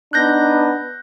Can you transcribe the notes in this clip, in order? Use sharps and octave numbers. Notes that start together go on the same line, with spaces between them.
B3 D4 D#4 F#6 G6 A#6